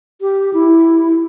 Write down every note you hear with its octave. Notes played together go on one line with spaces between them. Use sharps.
G4
E4